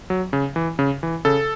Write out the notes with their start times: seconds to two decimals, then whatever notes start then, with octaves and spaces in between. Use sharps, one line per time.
0.10 F#3
0.33 C#3
0.56 E3
0.79 C#3
1.03 E3
1.25 C#3 A4